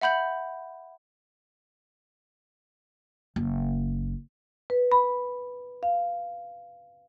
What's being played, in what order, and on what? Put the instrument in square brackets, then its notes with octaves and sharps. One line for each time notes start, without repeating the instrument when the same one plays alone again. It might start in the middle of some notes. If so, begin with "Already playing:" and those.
[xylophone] E5 F#5 B5 G6 F#7
[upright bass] F#1
[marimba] B4
B5
F5